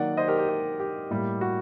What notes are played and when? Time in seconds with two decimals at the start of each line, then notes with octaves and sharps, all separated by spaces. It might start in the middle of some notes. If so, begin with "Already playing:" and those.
Already playing: D#3 F#3 A#3 D5 F#5
0.17 C5 D#5
0.28 G4 A#4
0.38 G4
0.49 G4
0.80 G4
1.11 A2 G3 A#3
1.41 F#4